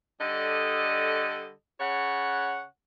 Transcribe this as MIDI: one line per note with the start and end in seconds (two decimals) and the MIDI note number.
0.20 1.51 50
0.20 1.51 55
0.20 1.51 69
0.20 1.51 75
1.80 2.64 49
1.80 2.64 73
1.80 2.64 78